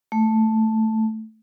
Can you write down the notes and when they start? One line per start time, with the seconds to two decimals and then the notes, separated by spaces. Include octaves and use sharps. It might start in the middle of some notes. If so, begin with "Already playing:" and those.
0.12 A3